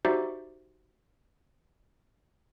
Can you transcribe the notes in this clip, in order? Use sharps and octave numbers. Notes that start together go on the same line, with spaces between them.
D#4 F#4 G4 C5 D5 E5